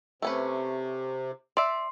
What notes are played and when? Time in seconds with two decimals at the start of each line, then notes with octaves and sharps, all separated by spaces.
0.22 C3 A3 C#4 B4
1.57 D5 E5 C6